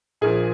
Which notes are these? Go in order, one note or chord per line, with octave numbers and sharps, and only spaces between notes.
A#1 A#2 F3 G#4